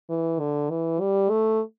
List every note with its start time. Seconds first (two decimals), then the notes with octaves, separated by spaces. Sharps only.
0.10 E3
0.40 D3
0.70 E3
1.00 G3
1.30 A3